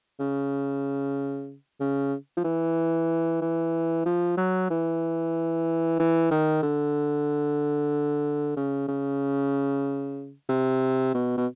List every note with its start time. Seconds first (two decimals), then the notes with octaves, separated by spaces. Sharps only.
0.19 C#3
1.80 C#3
2.37 F3
2.44 E3
3.41 E3
4.06 F3
4.37 F#3
4.70 E3
5.99 E3
6.31 D#3
6.63 D3
8.57 C#3
8.88 C#3
10.49 C3
11.14 B2
11.37 B2